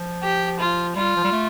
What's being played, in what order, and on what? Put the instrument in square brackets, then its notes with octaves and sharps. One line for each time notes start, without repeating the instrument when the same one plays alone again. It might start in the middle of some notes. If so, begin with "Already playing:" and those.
Already playing: [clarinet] F3
[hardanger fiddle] G4
F4
[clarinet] G3 [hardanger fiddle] F4
[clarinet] F3
G3
A3